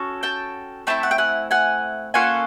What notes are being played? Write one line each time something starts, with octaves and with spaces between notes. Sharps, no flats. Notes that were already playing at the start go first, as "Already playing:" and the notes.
Already playing: C#4 F#4 A4
G5 A5
A3 C4 E4 G5 A5
F#5
G5
F#5 G#5
F#5 G#5
A#3 C#4 F4 A4 F#5 G#5